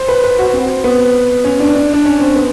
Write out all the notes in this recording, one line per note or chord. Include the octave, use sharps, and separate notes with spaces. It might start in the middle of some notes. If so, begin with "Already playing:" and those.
Already playing: C5
B4
B4
F#4
C4
B3
C#4
D4
D4
D4
C#4
C4
B3